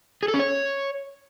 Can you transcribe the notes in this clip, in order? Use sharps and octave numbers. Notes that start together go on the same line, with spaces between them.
G#4
A4
C#4
C#5